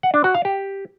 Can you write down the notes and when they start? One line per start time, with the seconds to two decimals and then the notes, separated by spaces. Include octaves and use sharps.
0.03 F#5
0.14 D4
0.24 F#4
0.35 F5
0.45 G4